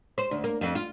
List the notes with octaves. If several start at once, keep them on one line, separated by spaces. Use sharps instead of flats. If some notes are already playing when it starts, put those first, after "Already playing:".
C5
D2
A#3
F2
F4